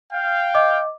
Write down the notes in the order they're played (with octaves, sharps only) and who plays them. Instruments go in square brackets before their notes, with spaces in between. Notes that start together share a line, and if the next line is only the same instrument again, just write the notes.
[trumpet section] F5 G5
[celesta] D#5 D6